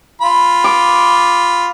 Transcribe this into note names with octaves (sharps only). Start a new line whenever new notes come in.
F4 B5
D6